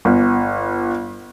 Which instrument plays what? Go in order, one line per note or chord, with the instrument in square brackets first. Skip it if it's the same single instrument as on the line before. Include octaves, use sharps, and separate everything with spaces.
[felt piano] G1